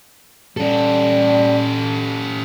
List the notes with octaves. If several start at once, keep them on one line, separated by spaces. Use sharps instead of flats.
G3 C#4 A4